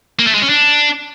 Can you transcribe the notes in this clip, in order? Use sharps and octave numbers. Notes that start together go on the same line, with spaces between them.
A#3
A3
G#3
C#4
D4